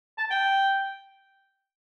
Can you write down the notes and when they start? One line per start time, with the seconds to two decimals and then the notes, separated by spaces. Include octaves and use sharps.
0.18 A5
0.31 G5